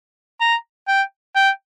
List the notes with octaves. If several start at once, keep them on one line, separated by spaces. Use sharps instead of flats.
A#5
G5
G5